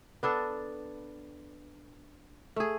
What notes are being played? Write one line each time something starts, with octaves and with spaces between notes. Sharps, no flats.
B3 D4 A4
A3 G#4